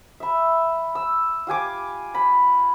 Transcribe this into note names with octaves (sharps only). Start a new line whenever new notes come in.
E5 B5
E6
F4 G4 G#5 D6
B5